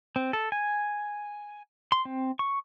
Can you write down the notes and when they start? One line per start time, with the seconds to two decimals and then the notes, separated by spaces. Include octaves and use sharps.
0.16 C4
0.33 A4
0.52 G#5
1.92 C6
2.05 C4
2.39 C#6